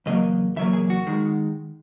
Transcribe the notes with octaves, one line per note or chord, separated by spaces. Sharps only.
E2 C#3 F#3 A#3 D#5
E2 C#3 F#3 A#3 E5
G#4
F#4
D#3 G#3